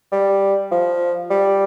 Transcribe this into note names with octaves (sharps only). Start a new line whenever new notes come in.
G3
F3
G3